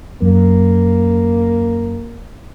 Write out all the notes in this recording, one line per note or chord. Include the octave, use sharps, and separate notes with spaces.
F#2 A#3